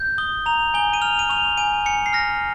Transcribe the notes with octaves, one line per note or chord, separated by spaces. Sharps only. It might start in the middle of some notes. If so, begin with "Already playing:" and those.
Already playing: G6
D#6 G7
A#5 F7
G#5 G7
D#7
F6 F7
D#7
C#6 F7
G#5 D#7
G#5 C#7
C7
F6 A#6